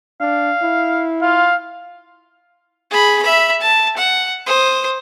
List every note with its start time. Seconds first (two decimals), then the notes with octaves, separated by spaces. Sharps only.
0.21 D4 F5
0.62 E4
1.22 F4 F5
2.90 G#4 B5
3.22 E5 B5
3.61 A5
3.97 F#5
4.46 C5 D#6